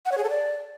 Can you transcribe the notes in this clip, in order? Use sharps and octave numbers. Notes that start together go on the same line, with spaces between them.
F#5
C#5
G#4
A4
D5